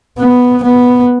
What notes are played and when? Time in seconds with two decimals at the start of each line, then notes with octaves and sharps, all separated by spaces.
0.18 B3
0.63 B3